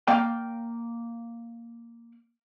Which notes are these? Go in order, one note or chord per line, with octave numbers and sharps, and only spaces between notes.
A#3 D5 F5 G5